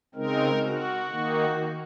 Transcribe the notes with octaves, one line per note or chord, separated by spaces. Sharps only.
C#3 G#3 C4 D#4 A#4
F#4
D#3 A#3 D#4